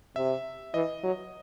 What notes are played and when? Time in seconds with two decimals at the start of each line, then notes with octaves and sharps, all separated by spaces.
0.16 C3 E5
0.74 E3 D#5
1.03 F#3